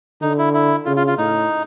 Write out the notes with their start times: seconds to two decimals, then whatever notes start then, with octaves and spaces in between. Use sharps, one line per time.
0.22 D3 D#4
0.38 E4
0.54 E4
0.85 C#3 F4
0.97 F4
1.07 F4
1.18 A2 D#4